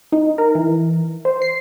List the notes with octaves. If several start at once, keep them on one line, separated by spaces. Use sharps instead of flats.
D#4
A#4
E3
C5
C7